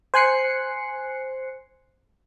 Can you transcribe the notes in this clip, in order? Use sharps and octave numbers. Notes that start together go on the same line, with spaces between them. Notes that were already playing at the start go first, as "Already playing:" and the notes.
C5 G#5 F#6 C7 C#7